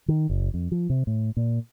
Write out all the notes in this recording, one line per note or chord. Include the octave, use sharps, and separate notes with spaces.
D#3
F#1
F2
F3
C3
A2
A#2